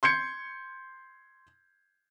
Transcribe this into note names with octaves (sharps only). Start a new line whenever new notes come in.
C6 G6 G#6 C#7